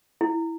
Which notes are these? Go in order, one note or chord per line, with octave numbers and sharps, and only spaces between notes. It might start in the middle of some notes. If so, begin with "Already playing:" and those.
E4